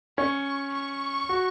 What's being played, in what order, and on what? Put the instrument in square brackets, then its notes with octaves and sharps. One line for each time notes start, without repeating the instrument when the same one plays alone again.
[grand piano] C#4 [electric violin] C#6
[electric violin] C#6
[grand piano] F#4